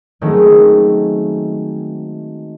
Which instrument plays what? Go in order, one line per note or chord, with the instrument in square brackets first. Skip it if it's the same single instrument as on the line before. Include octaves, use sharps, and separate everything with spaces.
[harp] D#3 F#3 G#3 A3 C4 C#4